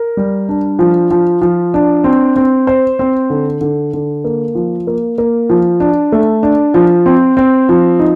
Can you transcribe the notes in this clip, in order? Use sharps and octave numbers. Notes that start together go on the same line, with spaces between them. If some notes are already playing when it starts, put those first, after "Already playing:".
Already playing: A#4
G3
D4
F3
F3
F3
D4
C4
C4
C5
C4
D3
D3
D3
A#3
F3
A#3
A#3
F3
D4
A3
D4
F3
C4
C4
F3
D#4